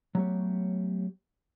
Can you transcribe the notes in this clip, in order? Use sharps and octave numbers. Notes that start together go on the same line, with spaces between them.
F#3 G3 A3 B3 G4 C#5